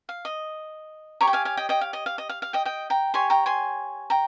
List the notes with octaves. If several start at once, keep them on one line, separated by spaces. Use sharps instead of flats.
F5
D#5
G4 C#5 A#5 C#6
G5
F5 G#5
F5 G#5
D#5 G5
D#5 G5
F5
D#5
F5
D#5
F5
F5
D#5 G5
D#5 G5
G5 A#5
G4 C#5 G#5 C6
G5 A#5
G#5 C6
G5 A#5